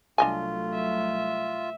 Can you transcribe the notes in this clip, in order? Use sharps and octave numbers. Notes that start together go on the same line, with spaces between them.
C2 F#3 A3 D4 F4 D#5 G#5
E5